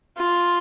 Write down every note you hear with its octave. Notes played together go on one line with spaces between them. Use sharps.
F4